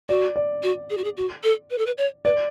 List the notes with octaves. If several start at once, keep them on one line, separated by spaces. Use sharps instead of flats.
F#4 D5
D5
F#4
G#4
F#4
G#4
F#4
A4
B4
A4
B4
C#5
B4 D5